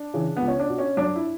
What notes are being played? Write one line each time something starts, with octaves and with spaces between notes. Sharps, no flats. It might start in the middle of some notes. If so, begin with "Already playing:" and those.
Already playing: D4
C#3 E3
C#2 B3
C#4
D4
B2
C#4
F#2 D4
E4